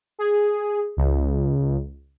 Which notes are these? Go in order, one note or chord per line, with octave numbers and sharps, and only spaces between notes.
G#4
C#2